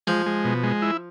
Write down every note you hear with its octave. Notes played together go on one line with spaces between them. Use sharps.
F3 G#3
G#3
B2
G#3
E4